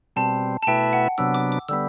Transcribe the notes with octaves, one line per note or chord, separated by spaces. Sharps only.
B2 G3 C4 A5
A5
B2 A3 E4 B4 E5 G5
F#5
C3 F#3 B3 D4 E6
D6
D6
D3 G3 B3 E6